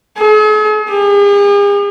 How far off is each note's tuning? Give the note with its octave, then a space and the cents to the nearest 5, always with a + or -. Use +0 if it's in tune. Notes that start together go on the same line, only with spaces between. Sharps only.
G#4 +45
G#4 -45